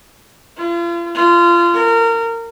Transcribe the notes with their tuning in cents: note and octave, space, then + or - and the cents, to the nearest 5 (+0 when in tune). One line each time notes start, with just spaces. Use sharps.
F4 -40
F4 -25
A#4 -25